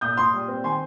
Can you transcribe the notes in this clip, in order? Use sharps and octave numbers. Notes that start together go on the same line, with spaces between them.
A#2 D#6 G6
A#2 C6 D#6
G3
C4
D#3 G#5 C6